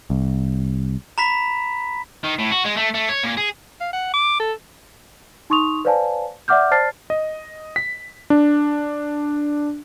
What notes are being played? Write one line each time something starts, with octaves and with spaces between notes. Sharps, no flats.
C2
A#5 B5 B6
D#3
A2
F#4
G#3
A3
A3
C#5
A#2
G#4
F5
F#5
D6
A4
D#4 C6 C#6 D#6 F7
B4 C5 D5 F5 G#5 A5
D5 E5 F#5 D6 F6 G6
C5 D5 A5 F6 A6 C7
D#5
B6
D4